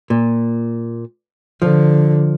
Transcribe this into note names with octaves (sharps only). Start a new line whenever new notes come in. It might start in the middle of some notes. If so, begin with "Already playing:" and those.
A#2
D3 F3